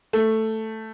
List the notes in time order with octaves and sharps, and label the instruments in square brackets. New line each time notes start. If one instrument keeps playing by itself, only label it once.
[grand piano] A3